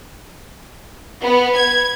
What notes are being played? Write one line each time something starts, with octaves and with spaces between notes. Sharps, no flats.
B3
G#6